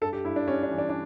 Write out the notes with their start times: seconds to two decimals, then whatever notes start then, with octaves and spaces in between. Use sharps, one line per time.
0.01 G2 A4
0.13 G4
0.24 G2 E4
0.36 D4
0.48 G3 C#4
0.63 D4
0.70 E3
0.78 D4
0.90 D4